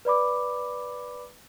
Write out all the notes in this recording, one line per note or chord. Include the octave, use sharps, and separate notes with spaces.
B4 D5 B5 D6